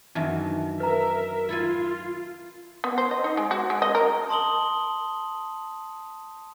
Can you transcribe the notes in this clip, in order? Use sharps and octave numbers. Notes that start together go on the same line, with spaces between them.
F#2 D#3 E3 D4 D#4 E5
A#4 B4 E5 A#5
E4 F4 A4 G#5
B3
C5
D#5
D#4
G#3
F#4
G#3
D#5
A#4
A5 C6 D#6 F#7 G7